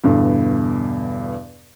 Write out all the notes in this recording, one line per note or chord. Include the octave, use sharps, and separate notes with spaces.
E2 G2 B2 D3